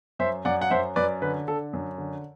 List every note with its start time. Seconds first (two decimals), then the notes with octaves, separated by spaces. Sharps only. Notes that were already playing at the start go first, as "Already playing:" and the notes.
0.19 F#2 C5 E5
0.45 F#2 D5 F#5
0.61 F#5
0.71 F#2 C5 E5
0.96 F#2 B4 D5
1.22 D3 B4
1.47 D3 A4
1.73 F#2
1.98 D3